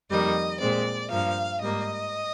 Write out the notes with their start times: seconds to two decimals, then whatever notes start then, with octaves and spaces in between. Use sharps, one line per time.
0.10 F2 D#3 G3 A#3 D#5
0.59 A#2 G#3 C4 D5
1.10 G2 F3 A#3 F5
1.60 G#2 G3 A#3 D#5